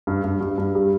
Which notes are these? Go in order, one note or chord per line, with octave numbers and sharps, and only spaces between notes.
G2
G2
G2
G2
G3